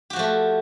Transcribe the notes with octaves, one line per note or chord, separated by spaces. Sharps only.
F3 A3 F#4 G4